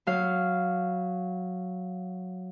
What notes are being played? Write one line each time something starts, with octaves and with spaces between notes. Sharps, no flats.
F#3 F5